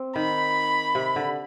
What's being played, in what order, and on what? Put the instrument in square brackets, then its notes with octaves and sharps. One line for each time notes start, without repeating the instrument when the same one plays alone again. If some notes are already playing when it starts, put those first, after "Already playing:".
Already playing: [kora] C4
[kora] D#3 [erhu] B5
[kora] C3
D3